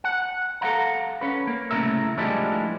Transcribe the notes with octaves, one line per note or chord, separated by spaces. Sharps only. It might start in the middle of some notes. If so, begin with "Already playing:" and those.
F#5
A4 A#4 F5 F#5 A#5
C#4 B4
A#3
C2 A2 C#3 A#4 E5
A2 F3 G3 G#3 D4 E4